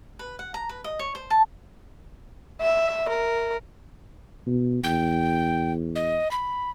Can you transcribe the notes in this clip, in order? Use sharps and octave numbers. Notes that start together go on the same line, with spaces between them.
B4
F#5
A#5
B4
D#5
C#5
C5
A5
E5
A#4
B2
E2 G5
D#5
B5